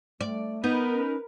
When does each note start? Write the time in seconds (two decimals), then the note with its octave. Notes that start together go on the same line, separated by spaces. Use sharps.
0.21 A3 D5
0.64 B3 D#4 A#4 B4
0.93 C#4